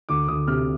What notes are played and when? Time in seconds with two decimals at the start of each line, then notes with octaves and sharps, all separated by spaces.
0.09 D2 D6
0.28 D2 D#6
0.47 C3 F6